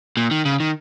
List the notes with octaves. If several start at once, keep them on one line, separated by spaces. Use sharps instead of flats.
A#2
D#3
C#3
D#3